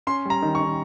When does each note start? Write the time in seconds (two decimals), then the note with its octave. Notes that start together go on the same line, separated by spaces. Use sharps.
0.07 C#4 C6
0.25 G3 A#5
0.42 D#3
0.55 C#6
0.60 D#3